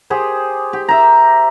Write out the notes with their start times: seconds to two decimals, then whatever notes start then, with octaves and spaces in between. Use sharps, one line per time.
0.10 G4 G#4 C5
0.73 G4
0.89 E5 A#5